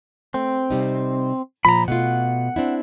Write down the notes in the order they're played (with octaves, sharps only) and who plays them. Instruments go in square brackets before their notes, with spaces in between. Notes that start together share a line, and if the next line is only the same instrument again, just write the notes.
[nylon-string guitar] A3 [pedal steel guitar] C4
[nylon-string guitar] C3 G3 D#4
[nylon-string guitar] A#2 F3 [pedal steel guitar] A#5 B5
[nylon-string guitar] B2 A3 F4 [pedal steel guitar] F#5
[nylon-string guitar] C4 D4 E4